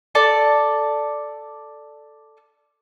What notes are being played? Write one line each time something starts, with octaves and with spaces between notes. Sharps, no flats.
A4 D5 A5